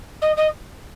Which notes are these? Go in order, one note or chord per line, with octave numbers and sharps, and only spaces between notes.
D#5
D#5